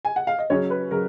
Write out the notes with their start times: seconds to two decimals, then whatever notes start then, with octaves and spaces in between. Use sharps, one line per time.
0.05 G#5
0.16 F#5
0.27 F5
0.39 D#5
0.50 C#3 F#3 C#4 C#5
0.70 B4
0.91 C#3 F#3 A#4